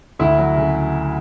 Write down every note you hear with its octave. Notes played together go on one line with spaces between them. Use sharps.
D2 E4
F#3
C#3